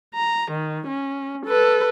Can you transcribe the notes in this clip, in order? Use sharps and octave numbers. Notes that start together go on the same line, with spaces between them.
A#5
D#3
C#4
A4 B4